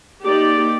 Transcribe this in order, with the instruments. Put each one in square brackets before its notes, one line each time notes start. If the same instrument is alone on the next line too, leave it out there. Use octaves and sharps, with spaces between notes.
[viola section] A#3 D#4 G4 D5